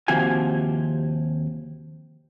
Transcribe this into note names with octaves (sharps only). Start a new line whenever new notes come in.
D#2 C3 F3 F#4 G4 G#5